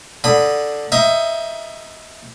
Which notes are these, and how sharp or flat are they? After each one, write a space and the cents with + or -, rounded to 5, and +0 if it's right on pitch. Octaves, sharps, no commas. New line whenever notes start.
D3 +0 B5 +0 D#6 +0
D#4 +25 E5 +15 D#6 +0